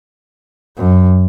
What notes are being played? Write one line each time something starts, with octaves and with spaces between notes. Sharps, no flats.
F#2